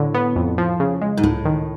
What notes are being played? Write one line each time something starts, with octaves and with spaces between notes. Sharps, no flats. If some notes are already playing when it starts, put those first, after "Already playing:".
Already playing: A2 D3
B3
F2
F3
C#3
G#3
G#2
C#2 A2
D#3